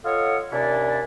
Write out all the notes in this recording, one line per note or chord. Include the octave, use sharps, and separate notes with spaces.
F4 A4 C#5 D#5 F5 F#5
D#2 C3 C#4 D4 E4 D5